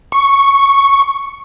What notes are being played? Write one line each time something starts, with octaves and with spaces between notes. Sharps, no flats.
C#6